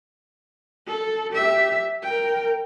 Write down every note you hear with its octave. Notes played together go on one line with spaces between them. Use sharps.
A4
G4 E5
A#4 G5